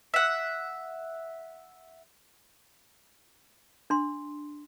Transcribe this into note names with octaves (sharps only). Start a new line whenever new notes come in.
E5 F#5
D4 C6